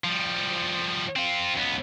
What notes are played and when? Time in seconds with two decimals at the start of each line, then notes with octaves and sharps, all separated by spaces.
0.04 F3 G3
1.16 C4 F4
1.56 C#2 B3